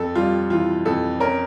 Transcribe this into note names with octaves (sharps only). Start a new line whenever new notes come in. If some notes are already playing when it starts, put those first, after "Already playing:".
Already playing: F2 A4
G3 F4
E3 F4
F2 A4
C#4 A#4